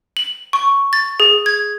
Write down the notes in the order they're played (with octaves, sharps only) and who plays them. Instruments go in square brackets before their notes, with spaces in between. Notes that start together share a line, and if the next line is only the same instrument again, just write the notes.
[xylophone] F#7
C#6
A6
G#4
G#6